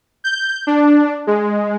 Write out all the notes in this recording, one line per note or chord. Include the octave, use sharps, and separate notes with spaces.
G6
D4
G#3